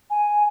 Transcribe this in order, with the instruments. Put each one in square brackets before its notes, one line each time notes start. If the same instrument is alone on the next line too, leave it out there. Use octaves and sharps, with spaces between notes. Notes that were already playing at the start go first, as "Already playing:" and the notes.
[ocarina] G#5